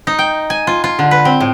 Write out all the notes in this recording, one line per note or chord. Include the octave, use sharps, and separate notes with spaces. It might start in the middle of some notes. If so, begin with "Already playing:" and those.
D#4
G5
G#5
F4
F4
D3
B4
C4
A2